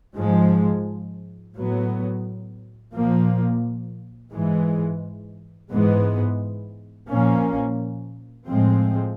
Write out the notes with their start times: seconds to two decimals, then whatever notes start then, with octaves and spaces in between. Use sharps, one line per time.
0.16 G#2 F3 G#3
1.55 A2 F#3 B3
2.93 A#2 F3 A#3
4.32 G#2 E3 G#3
5.70 G#2 E3 G#3 B3
7.08 A#2 F3 A#3 C#4
8.47 A2 F3 G#3 C4